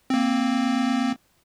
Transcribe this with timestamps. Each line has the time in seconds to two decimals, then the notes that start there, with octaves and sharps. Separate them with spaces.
0.10 A#3 C4